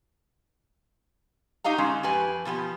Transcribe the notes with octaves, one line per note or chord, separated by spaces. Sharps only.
D#4 G4 D#5 F5 A#5
D3 G#3 C#4
F2 G4 B4 G#5
B2 F3 B3 G4